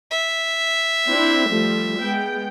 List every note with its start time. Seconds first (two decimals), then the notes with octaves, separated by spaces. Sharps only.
0.11 E5
1.08 C4 D4 E4
1.48 F3 G3 A3
1.99 G#3 B3 G5